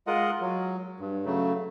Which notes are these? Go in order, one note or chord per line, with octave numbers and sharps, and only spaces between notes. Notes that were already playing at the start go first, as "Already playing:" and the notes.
G#3 F4 A#4 D#5 F#5
F#3
G2
C#3 F#3 A3